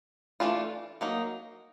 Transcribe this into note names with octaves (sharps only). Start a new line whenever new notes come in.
E3 A3 D4 F4
F#3 A#3 D#4